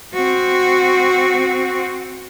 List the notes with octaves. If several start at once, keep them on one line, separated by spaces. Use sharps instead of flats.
C4 F#4